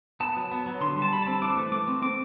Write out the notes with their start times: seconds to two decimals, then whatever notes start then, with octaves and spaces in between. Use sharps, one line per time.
0.20 B3 A5
0.36 F#3
0.51 B3
0.66 F#3
0.81 D3 C6
0.96 G3
1.02 A5
1.12 G3 B5
1.22 C4 A5
1.42 E3 D6
1.57 A3
1.72 A3 D6
1.87 C4
2.02 C4 D6